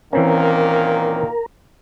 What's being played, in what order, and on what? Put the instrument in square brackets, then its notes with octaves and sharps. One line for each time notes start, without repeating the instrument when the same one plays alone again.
[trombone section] A#2 D#3 A#3 [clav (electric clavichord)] E3 C4 C#4 [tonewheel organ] A#4